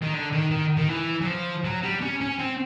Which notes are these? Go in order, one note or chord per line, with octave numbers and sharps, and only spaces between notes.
D#3
D3
D#3
D#3
D#3
E3
F#3
F3
F#3
G3
C#4
C#4
C4